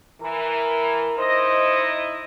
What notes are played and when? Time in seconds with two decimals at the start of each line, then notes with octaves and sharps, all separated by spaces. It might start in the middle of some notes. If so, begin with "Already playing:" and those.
0.22 E3 A#4
1.18 D#4 E4 C5 D#5